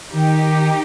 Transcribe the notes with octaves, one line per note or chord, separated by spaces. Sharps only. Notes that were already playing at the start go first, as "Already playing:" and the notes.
D#3 D#4 G4